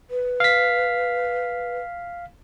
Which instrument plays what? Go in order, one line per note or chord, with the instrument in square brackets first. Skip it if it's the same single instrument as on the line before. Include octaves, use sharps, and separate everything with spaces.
[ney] B4
[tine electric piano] F5 B6